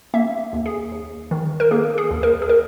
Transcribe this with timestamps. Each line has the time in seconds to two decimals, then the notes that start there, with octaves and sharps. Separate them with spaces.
0.14 A#3 E5
0.53 D#2
0.66 G#4
0.92 D#2
1.31 D#3
1.60 A#4
1.71 A#3 G#4
1.98 G#4
2.11 D#2
2.23 A#4
2.42 G#4
2.49 A#4